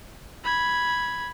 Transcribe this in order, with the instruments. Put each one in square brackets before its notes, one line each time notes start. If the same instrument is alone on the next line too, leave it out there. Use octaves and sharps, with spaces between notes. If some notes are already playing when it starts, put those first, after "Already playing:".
[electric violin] B5 G#6